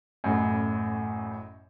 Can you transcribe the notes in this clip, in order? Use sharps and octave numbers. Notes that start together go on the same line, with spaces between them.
A1 F#2 A2